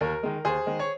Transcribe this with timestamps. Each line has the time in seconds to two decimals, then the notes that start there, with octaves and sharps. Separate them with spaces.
0.01 D#2 A#4
0.23 D#3 G#3
0.45 D#2 G#4 C5
0.66 D#3 G#3
0.79 C#5